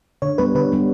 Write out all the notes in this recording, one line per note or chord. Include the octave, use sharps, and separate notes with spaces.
D3 C#5
G3 B3 B4
D3 B4
G3 B3